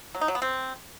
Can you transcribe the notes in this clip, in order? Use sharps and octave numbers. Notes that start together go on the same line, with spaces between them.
F#3
D#4
F#3
B3
C4